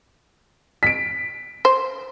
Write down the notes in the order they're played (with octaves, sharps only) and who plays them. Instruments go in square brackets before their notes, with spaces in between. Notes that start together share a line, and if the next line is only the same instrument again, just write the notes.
[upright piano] B6 D7
[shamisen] C5